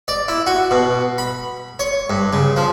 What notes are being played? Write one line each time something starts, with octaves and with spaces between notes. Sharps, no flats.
D5
E4
F#4
B2
B5
C#5
G2
C#3
F3